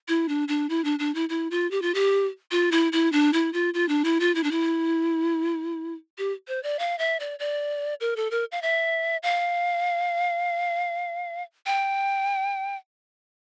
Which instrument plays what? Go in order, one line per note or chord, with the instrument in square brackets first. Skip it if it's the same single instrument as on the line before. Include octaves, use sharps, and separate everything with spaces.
[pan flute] E4
D4
D4
E4
D4
D4
E4
E4
F4
G4
F4
G4
F4
E4
E4
D4
E4
F4
F4
D4
E4
F4
E4
D4
E4
G4
C5
D5
F5
E5
D5
D5
A#4
A4
A#4
F5
E5
F5
G5